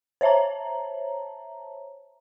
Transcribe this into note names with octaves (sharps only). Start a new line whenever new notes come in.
C5 C#5 E5 A5 A#5